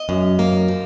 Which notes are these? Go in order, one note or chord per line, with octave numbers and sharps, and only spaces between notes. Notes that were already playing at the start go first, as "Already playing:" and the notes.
Already playing: D#5
F#2
A#3
F3